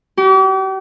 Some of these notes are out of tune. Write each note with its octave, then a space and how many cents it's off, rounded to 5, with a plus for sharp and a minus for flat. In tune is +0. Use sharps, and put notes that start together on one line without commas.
G4 -40